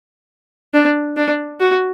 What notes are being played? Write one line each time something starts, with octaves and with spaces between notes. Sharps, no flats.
D4
D4
F#4